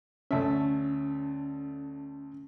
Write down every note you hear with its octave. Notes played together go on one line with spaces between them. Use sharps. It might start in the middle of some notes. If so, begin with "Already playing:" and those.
D2 A3 C#4 E5